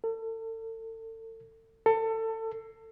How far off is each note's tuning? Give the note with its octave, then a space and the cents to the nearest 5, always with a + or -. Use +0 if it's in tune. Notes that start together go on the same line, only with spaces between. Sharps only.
A4 +35
A4 +25